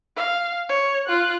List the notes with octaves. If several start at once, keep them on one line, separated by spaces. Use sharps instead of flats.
F5
C#5
F4 F#6